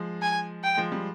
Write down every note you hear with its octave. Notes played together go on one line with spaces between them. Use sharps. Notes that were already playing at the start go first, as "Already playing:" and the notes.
Already playing: F3 G#3
G#5
G5
F3 G#3
G3